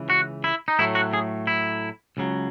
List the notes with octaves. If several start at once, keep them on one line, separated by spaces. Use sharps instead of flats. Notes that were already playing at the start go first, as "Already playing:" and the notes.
Already playing: C#2 C#3 E3
F#4
E4
D#4
A2 F#3 A3 E4
F#4
G#4
E4
C#2 C#3 F#3